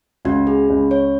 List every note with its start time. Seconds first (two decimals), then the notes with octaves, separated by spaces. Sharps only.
0.25 C#2 F#4
0.47 G#4
0.70 C#2
0.91 C#5